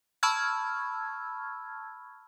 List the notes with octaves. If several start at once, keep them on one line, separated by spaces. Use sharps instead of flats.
A5 B5 C#6 E6 F6 G#6